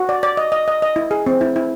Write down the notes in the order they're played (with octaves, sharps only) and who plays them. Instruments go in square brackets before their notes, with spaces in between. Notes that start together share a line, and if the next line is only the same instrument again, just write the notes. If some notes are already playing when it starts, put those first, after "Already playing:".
Already playing: [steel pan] F#4
D5
D5
D#5
D#5
D#5
D#5
E4
G#4
C4
E4
E4